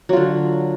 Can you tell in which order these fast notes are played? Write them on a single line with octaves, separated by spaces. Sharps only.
F#3 F4 D3